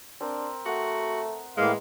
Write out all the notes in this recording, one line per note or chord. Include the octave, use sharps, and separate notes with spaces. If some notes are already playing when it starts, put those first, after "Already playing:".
C4 D4 A#4 C5
A3 F#4 F#5 A#5 D#6
A2 E3 G#3 A#3 F5